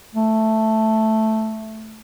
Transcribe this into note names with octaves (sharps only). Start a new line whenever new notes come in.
A3